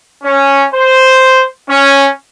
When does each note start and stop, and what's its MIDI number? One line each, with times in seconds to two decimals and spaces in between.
0.24 0.65 61
0.73 1.43 72
1.69 2.08 61